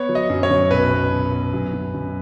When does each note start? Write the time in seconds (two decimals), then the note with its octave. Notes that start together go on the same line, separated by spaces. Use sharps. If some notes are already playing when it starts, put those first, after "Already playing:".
Already playing: B3 C#5
0.09 F#3
0.15 D#5
0.30 F#2
0.43 C#5
0.50 F#2
0.71 B1 B4
0.91 B3
1.11 B2
1.32 B3
1.54 F#2
1.73 F#2
1.94 F#2